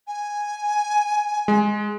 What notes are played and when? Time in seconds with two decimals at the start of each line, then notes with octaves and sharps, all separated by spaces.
0.07 G#5
1.48 G#3